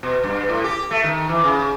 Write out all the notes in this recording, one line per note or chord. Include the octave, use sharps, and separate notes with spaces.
B2
G2
A2
G4
A3
D#3
E3
C#3